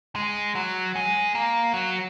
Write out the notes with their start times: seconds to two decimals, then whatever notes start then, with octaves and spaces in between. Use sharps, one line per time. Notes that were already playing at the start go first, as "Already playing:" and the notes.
0.16 G#3
0.55 F#3
0.96 G#3
1.35 A#3
1.74 F#3